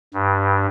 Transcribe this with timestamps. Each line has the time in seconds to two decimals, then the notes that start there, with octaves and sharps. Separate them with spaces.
0.14 G2